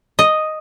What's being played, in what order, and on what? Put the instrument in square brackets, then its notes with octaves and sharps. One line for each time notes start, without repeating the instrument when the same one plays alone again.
[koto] D#5